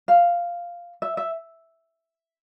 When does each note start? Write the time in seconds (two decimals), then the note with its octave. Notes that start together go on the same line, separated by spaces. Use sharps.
0.08 F5
1.02 E5
1.17 E5